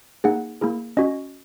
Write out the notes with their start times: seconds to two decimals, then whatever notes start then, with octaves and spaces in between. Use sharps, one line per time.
0.24 A#3 D#4 G#4 F#5
0.61 A#3 E4 G#4
0.97 C#4 F#4 D#5